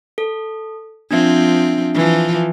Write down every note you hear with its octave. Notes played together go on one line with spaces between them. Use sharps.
A4
F3 C4 D4 E5
E3 F3